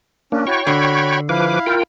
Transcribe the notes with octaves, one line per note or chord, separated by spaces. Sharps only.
A#3 C#4 D4
E4 F#4 C#5 G5 C#6
D3 F#4 B5
F3 E4 B4 F5 D6
F4 A#4 G5